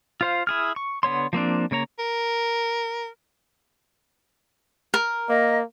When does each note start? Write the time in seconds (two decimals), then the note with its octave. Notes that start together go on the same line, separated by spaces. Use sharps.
0.21 F4 C5 F5
0.47 E4 G#4 F6
0.76 C#6
1.03 D3 B3 C#5 C6
1.33 F3 A#3 C4 D4
1.71 C#3 A#3 C#5 A#5
1.99 A#4
4.94 A#4
5.29 A#3 D#5